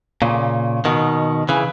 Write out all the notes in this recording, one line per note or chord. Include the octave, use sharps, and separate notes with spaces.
A#2 C#3
B2 D#3
C#3 E3